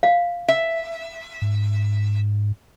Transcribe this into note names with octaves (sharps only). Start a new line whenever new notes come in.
F5
E5
G#2